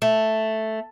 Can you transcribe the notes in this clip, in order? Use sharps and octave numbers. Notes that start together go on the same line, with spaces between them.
A3